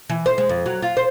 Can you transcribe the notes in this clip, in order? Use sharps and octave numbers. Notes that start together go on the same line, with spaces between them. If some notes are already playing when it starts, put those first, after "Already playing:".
E3
C5
G#3
F2
F#3
F4
C5